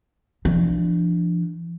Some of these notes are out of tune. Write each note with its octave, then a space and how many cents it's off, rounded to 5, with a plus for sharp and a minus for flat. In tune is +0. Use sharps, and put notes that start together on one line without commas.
F3 -35 D4 +10